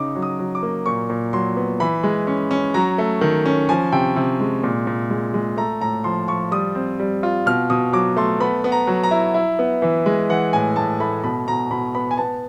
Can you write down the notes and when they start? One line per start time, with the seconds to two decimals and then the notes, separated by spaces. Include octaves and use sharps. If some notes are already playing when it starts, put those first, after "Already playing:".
Already playing: C#3 D#4 D6
0.15 F#3
0.22 D#6
0.39 F#3
0.55 D6
0.63 A#3
0.86 A#2 C#6
1.10 A#2
1.33 F#3 C6
1.57 B3
1.80 E3 B5
2.04 G#3
2.27 C#4
2.51 C#4
2.74 F#3 A#5
2.98 A3
3.21 D#3
3.46 C#4
3.69 F3 G#5
3.92 C3 G5
4.16 C3
4.40 G#3
4.64 A#2
4.87 A#2
5.10 G#3
5.34 G#3
5.57 A3 A#5
5.81 A2 A#5
6.04 F3 C6
6.28 F3 C#6
6.51 G3 D#6
6.75 C4
6.99 G3
7.23 F4
7.46 B2 F6
7.70 B2 D#6
7.93 F#3 D6
8.16 A3 C6
8.40 B3 B5
8.64 B3
8.72 A#5
8.87 F#3
9.03 A#5
9.11 E4
9.34 E4
9.59 B3
9.82 E3
10.06 G#3
10.29 E3 F#5
10.53 A2 G#5
10.76 A2 A5
11.00 A3 B5
11.23 B2 B5
11.47 B2 A#5
11.71 B2 B5
11.95 B3 B5
12.11 G#5
12.17 B3 A5